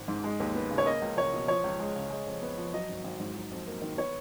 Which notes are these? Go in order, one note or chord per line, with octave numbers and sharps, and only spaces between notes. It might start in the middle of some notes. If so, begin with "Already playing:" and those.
Already playing: G#1
G#2
G#3
D#2
B3
C#3
C#5
A#3 D#5
C#2
C#2 C#5
B2
F3 C#5
C#2
G#3
C#3
G#3
F2
B3
F3
F#3 D#5
G#1
G#1
G#2
F#3
F2
A#3
D#3
B3 C#5